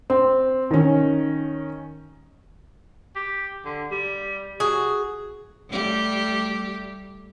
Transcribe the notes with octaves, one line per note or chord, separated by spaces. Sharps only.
C4
D#3 C#4
G4
D3
G3
F#4 G#4
G3 A3 G4